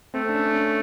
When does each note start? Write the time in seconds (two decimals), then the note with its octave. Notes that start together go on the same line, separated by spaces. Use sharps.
0.14 A3 C4
0.29 D4
0.34 C#4
0.54 C#4